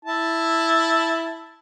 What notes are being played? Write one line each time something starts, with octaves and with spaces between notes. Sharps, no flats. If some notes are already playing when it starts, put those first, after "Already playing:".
E4 A5